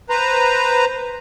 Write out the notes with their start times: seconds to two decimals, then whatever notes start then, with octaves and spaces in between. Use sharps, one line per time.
0.09 B4 C5 A#5